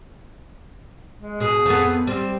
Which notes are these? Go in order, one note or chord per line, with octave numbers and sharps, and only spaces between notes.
G#3
B2 G#4
F2 B3
G3 C4